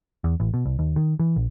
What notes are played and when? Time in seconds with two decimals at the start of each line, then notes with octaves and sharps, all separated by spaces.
0.24 E2
0.40 A1
0.54 B2
0.66 C2
0.79 D#2
0.96 D#3
1.19 E3
1.36 A#1